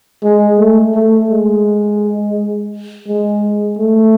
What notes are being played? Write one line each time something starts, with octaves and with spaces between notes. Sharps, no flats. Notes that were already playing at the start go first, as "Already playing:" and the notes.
G#3
A3
A3
G#3
G#3
A3